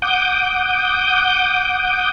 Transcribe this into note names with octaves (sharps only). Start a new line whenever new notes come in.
F#5 D6 D#6 G6